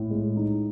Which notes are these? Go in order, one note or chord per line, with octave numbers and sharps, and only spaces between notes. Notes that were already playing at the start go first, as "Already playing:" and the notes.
Already playing: A2
G#3
D#4